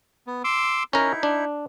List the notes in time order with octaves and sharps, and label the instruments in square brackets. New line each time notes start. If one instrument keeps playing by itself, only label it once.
[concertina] B3
C6 D6 E6
[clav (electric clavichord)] C#4 A#4 [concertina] D#4 E4
[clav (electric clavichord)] D4